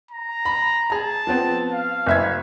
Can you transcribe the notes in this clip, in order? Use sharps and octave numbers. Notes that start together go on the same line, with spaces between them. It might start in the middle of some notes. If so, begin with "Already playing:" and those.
A#5
B5
G#4 A5 A#5
F3 B3 C4
F5
F#1 E5 G#6